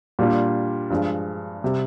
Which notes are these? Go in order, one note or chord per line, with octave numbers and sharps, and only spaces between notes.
A#2 G3 A#3 D4 F4
G2 F3 G#3
C3 G3